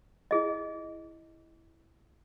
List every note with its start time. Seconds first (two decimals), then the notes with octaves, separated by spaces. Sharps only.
0.31 E4 G#4 D#5